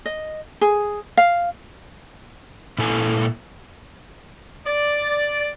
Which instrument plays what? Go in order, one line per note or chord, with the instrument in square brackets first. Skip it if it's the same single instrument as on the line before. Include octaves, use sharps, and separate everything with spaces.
[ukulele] D#5
G#4
F5
[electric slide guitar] A#2 E4 A4 G#5
[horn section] D5